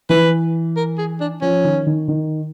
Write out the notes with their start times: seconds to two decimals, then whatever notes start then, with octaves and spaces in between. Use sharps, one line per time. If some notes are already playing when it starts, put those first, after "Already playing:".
0.09 E3 B4
0.76 A#4
0.98 G#4
1.20 D4
1.41 F3 C#4
1.64 D#3
1.86 D#3
2.08 D#3